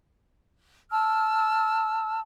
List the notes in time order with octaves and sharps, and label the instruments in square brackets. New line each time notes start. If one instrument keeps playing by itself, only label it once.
[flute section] A5 E6 F6